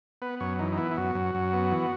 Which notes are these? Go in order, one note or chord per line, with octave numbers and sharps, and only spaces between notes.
B3 B4
F#2 C#5
E3 D#4
D#4
B3 E4
E4
F#2 F#4
F#2
F#2
B3
E3